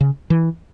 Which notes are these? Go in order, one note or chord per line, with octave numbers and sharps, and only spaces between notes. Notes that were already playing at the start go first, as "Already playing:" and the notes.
C#3
E3